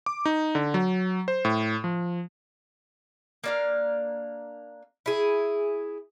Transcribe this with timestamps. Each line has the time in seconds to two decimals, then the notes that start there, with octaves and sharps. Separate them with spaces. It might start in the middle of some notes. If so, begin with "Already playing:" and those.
0.06 D6
0.26 D#4
0.55 D3
0.74 F#3
1.28 C5
1.45 A2
1.84 F3
3.44 A#3 D4 F5
5.06 E4 G#4